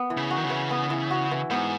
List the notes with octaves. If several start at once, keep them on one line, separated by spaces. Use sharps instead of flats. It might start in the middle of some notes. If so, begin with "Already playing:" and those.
Already playing: B3
E3
C#3
F#4
D#3
C#3
E3
B3
E3
F#4
E3
G#2 B3